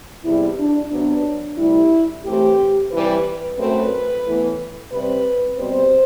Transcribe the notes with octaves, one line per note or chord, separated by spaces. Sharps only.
E2 C3 G3 E4
D4
C3 F#3 B3 D4
D2 C3 G3 E4
A2 E3 A3 C4 G4
C3 E3 G3 B4
F#2 F#3 A3 C4 B4
A2 E3 B3
C3 G3 C4 B4
B2 G3 C4 C5